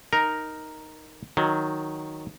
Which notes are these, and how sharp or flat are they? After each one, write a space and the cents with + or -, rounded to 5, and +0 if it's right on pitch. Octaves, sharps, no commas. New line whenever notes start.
D#4 +0 A#4 +0
D#3 +0 F#3 -10